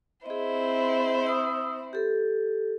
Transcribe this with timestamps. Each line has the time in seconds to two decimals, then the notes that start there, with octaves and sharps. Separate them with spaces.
0.26 C4 E4 G#4 C5 D#5
1.27 D#6 E6
1.93 G4 A4